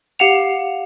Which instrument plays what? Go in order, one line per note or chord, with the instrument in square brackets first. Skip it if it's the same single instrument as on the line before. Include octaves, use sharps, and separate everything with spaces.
[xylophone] G4 F5 F#5 F7